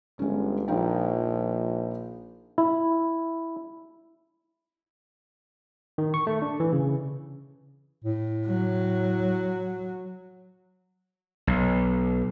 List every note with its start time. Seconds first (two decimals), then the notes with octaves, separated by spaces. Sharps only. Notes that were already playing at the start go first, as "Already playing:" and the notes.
0.19 G1 G#3 C#4
0.68 A#1 F3 D#4 G5
2.58 E4
5.98 D#3
6.14 C#6
6.27 A3
6.42 D4
6.60 E3
6.73 C#3
8.04 A2
8.46 F#3
11.47 B1